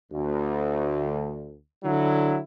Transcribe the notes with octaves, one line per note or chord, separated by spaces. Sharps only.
D2
D3 F#3 E4